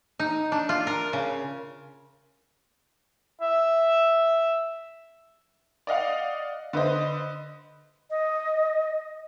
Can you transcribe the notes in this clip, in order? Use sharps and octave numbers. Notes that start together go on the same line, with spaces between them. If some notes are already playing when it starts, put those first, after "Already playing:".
D#4
D4
F4
A#4
C#3
E5
D5 D#5 F5 F#5
D3 B4 C5 D#5
D#5